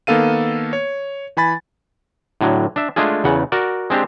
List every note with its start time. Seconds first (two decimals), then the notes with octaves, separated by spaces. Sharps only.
0.07 D#3 A#3 B3 A4 F5 D#7
0.73 C#5
1.37 E3 G#5 B5 A6
2.41 A2 D3 F#3
2.76 D4 E5
2.96 G#3 A3 D4 F4 G#4
3.24 E2 C#3 F#5
3.52 F#4 A#4 D5
3.90 G#3 C4 D4 G4